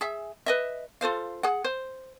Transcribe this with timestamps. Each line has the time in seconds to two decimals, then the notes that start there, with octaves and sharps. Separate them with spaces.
0.01 G#4 E5
0.46 B4 D#5 E5
1.01 F4 A4 C5 F5
1.43 G#4 F#5
1.64 C5